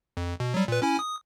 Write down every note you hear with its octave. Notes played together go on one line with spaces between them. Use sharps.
F2
B2
F#3 G3
A#2 B4
C#4 E4 G#5
D#6